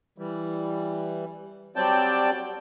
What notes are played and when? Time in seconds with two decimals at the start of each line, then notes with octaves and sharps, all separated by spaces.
0.18 E3 G3
1.76 F#3 G3 C4 D5 G5 A5